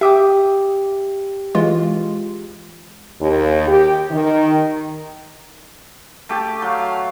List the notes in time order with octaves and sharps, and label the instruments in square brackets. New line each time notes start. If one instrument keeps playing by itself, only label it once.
[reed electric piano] G4 G5 [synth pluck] E5 D6 D#6
[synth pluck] E3 G#3 F4
[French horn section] D#2
G4
D#3
[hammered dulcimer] A3 G4 A5
[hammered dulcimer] F#3 [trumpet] F5